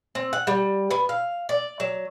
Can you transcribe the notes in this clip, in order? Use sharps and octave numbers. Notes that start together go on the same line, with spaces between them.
C4
F#5
G3
B3
F5
D5
F#3